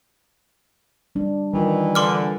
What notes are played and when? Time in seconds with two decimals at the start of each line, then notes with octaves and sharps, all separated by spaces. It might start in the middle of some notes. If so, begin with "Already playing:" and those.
1.15 G3 D4
1.54 D#3 E3 G3 F4 A#4
1.95 D3 C6 D6 F6